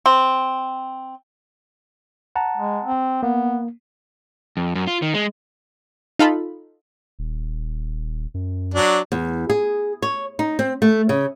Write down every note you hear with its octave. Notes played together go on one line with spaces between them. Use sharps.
C4
F#5 A5 A#5
G#3
C4
A#3 B3
F2
F#2
F4
D#3
G#3
D#4 F4 A4 B5
D#1
F#2
F#3 D4
E2
G#4
C#5
D#4
C4
A3
C#3